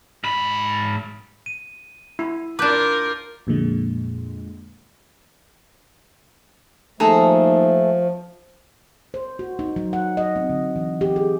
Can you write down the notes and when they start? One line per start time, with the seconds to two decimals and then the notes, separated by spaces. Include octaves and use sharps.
0.24 G#2 B5
1.46 D#7
2.19 E4
2.59 D4 F4 A#4 B4 D6 G6
3.47 F2 A#2 D3 G#3
7.00 D#2 F3 A3 G#4 A4 A#5
9.14 C5
9.39 F#4
9.59 D#4
9.76 F#3
9.93 F#5
10.17 D#5
10.36 C4
10.50 D3
10.76 E3
11.01 G4
11.16 G#4